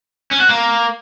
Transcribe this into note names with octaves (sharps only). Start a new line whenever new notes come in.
C#4
F#4
A#3